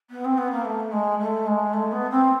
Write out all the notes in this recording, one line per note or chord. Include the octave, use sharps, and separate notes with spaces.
B3
C4
B3
A#3
A3
G#3
A3
G#3
A3
B3
C4